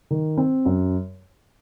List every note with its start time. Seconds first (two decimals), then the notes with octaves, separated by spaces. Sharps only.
0.10 D#3
0.37 C4
0.65 F#2